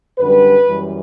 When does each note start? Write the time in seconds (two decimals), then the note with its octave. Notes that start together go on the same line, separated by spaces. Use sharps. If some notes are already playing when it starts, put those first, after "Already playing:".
0.19 F#2 D3 G3 B4
0.67 F#2 E3 G3